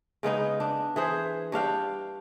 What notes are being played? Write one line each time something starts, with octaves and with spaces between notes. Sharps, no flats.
C#3 G#3 B3 D#4
D4
E3 G#4 C5
G2 D4 F5 G5